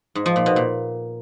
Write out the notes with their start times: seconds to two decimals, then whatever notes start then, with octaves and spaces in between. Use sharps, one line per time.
0.15 G#2
0.26 F3
0.36 A#2
0.46 B2
0.56 A#2